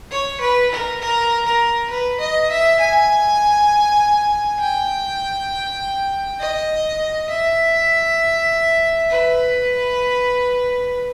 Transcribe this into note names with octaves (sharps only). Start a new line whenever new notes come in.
C#5
B4
A#4
A#4
A#4
B4
D#5
E5
G#5
G5
D#5
E5
B4